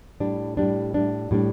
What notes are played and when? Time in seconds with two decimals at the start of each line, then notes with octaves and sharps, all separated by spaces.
0.20 A2 G3 D4
0.57 A2 G3 D4
0.94 A2 G3 D4
1.31 A2 G3 D4